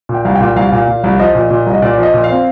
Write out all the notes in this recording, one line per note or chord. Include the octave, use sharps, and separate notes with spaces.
A#2
G5
C2 F5
G5
A#2
C2 F5
A#2
A#2
C2
F3 D#5
A#2
A#2
C2
D#5
A#2 D5
F3
D#5
A#2
F5
C4